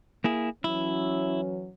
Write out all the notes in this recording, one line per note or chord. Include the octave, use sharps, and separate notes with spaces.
A#3 E4 G#4
E3 F#3 C#4 E4